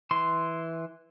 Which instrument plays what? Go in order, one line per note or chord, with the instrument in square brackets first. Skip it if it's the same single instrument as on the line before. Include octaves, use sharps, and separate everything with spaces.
[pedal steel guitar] E3 C6